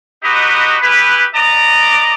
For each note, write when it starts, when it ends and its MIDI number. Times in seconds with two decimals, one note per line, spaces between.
0.22 0.76 63
0.22 0.76 64
0.22 0.76 66
0.22 0.76 67
0.22 0.76 71
0.22 0.76 75
0.81 1.24 64
0.81 1.24 67
0.81 1.24 68
0.81 1.24 71
1.34 2.14 59
1.34 2.14 74
1.34 2.14 75
1.34 2.14 82
1.34 2.14 86